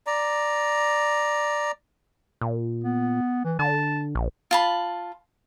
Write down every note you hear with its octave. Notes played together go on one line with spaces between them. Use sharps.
D5 A#5
A#2
B3
E3
D3 A5
A#1
F4 A5 B5